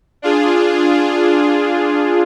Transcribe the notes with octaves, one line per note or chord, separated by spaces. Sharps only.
D4 F4 G#4